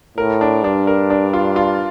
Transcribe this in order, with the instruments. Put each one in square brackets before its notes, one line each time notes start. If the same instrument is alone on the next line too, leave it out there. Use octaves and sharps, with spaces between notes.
[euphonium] A2 [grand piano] A#4
[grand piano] D4
[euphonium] G2 [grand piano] D4
[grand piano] A#4
D4
F4
F4